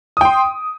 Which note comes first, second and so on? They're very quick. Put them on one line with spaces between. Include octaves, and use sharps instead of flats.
D#6 G5 C6